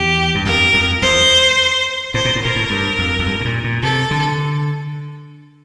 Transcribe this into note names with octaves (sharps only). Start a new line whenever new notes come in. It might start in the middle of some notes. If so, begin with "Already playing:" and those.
Already playing: E2 G4
G2
F2 A#4
F2
E2 C5
A2 C5
A#2
A2
A#2 A#4
A2
G2
F2
F2
G2
A2
A#2
A#2
C3 A4
D3